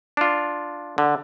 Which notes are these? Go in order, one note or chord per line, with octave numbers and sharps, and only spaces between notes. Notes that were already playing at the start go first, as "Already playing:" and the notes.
D4 F4
D3